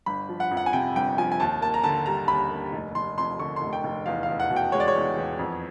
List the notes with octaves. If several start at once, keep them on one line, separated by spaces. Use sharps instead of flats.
G1 B5
F3
F#5
F2
F#5
G#5
C3 G5
G1 G5
F3 G#5
G#5
D#2 A5
A#3 A5
A#5
D3 A5
G3 A#5
D#2 B5
A#3
F1
F1 C6
F2 C6
D3 C#6
C6
F1
G5
F1
E2 F5
F5
E2
F#5
B2
G5
G#3 C#5
D5
C#5
E2
E2
F2